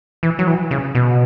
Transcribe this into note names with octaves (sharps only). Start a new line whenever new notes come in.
E3
F#3
E3
C#3
B2